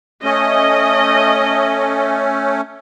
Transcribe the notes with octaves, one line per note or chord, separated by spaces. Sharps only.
A3 C#4 D#5